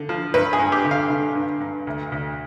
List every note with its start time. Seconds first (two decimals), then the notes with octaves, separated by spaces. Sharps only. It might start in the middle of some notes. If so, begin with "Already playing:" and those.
Already playing: D3
0.09 F3
0.34 G2 B4
0.53 G#4
0.59 G2
0.72 G4
0.85 D3
0.91 F5
1.10 D3
1.35 G2
1.60 G2
1.87 D2
2.12 D2